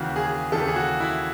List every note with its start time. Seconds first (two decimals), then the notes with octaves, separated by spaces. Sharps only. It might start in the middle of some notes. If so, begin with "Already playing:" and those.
Already playing: D#2 C#3 E3 F#4
0.16 G#4
0.52 D#2 C#3 E3 A4
0.67 G#4
0.76 F#4
1.00 E4